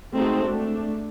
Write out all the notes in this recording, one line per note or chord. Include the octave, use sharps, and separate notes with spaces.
G#3 A3 C4 D#4 F#4 A4
A3 D4